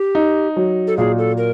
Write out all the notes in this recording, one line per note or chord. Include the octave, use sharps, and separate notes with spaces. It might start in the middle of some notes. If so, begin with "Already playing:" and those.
Already playing: G4
D#4
F#3
A4
A#2 G#4
A4
A#4